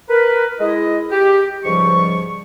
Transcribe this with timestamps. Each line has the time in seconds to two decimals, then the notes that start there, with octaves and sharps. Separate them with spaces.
0.09 A#4 B4
0.60 G#3 E4 D#5
1.10 G4
1.64 C#2 G#2 F3 G3 C#6